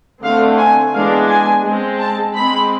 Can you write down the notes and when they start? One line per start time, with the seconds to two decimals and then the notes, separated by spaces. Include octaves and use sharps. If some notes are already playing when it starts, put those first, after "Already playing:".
0.24 D3 A3 C4 F5
0.59 G#5
0.94 E3 G#3 B3 D4 F5
1.29 G#5
1.64 G#3 C4
2.00 A5
2.35 G#3 C4 B5